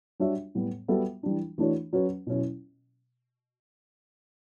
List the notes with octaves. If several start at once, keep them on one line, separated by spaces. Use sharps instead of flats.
G3 D4 F#4 C#5 E5
A2 G3 B3
G3 B3 F#4 A4 E5
E3 G3 D4
E3 A3 D4 F#4 C#5
F#3 C#4 F#4 B4
B2 F#3 C#4 E4